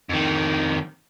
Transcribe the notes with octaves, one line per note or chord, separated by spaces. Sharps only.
F2 D#3